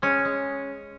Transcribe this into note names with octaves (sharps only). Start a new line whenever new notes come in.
G#3 C#4
G#3